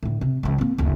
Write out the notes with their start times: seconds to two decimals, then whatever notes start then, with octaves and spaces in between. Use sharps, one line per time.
0.03 A2 D3
0.21 C3
0.43 C#2 F3
0.58 A#3 C4
0.78 F#1 D2